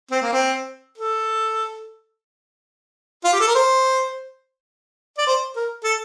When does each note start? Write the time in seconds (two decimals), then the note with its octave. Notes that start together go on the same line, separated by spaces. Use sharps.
0.11 C4
0.22 A#3
0.33 C4
0.98 A4
3.24 F4
3.33 G4
3.40 A4
3.47 A#4
3.55 C5
5.18 D5
5.27 C5
5.56 A#4
5.84 A4